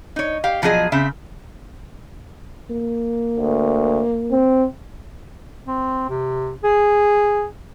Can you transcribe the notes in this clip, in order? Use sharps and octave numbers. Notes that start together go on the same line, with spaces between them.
D#4 C#5
G4 F5
B2 F3 F#3 D#4 G#4 D#5
C#3 C4 E5
A#3
D2
C4
C4
C3
G#4